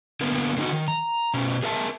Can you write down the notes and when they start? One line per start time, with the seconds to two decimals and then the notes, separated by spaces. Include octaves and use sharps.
0.21 D3 A#3 B3
0.57 D3 D#4 F#4
0.72 D#3
0.88 A#5
1.34 B2 C#4
1.63 G#4 A#4 E5 A5